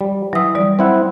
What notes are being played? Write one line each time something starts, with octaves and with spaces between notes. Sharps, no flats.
G3
E3 F#3 E5 D#6
G3 D5
C4 E4 F#5